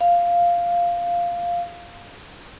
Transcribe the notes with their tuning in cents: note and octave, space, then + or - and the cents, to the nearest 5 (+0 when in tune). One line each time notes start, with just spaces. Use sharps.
F5 -5